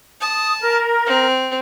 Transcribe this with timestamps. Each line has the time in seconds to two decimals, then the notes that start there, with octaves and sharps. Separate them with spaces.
0.21 A5 D#6
0.61 A#4
1.06 C4